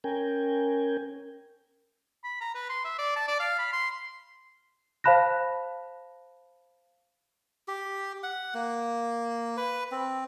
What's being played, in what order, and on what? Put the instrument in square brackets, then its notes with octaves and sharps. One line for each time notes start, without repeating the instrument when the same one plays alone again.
[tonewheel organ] C#4 A#4 G5 G#5
[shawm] B5
A#5
B4
C6
E5
D5
A5
D5
F5
B5
C6
[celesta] C5 F5 A5 B5 F#6 A#6
[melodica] G4
F#5
A#3
B4
C4